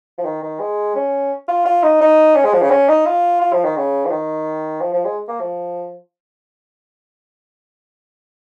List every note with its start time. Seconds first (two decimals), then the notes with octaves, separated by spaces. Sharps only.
0.18 F3
0.25 D#3
0.43 D#3
0.60 G#3
0.95 C#4
1.48 F4
1.65 F4
1.83 D#4
2.01 D#4
2.35 C#4
2.44 G#3
2.53 F3
2.62 C#3
2.71 C#4
2.88 D#4
3.06 F4
3.41 F4
3.53 F3
3.64 D#3
3.76 C#3
4.06 F3
4.11 D#3
4.81 F3
4.93 F3
5.05 G#3
5.28 A#3
5.40 F3